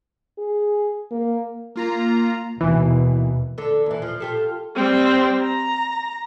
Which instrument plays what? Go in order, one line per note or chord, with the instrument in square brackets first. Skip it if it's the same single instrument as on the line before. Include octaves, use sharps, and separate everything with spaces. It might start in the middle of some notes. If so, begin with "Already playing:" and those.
[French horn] G#4
A#3
[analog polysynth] A#3 F4 A#5
[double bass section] D#2 B2 [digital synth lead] E3
[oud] D3 A4
D#2 E3
F3
F4 G4 A4
[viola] G3 C4
A#5